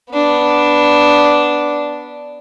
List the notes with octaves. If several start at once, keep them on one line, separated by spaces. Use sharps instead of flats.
B3 D4